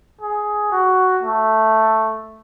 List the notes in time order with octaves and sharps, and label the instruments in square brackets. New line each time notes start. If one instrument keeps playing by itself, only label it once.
[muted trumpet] G#4
F#4
A3